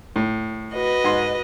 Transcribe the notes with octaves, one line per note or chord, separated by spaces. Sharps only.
A2
F#4 B4 D#5
G#2 C6